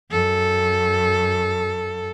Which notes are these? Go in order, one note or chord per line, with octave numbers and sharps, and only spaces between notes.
F#2 A4